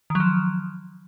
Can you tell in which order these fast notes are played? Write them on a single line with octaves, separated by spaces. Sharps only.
D#3 F#3 F3